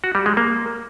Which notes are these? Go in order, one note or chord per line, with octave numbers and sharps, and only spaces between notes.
F#4
G3
G#3
A#3